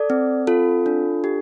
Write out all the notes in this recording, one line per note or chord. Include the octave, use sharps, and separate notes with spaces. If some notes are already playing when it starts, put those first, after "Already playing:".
Already playing: A4 D5
C4
F4 A4
D4
G4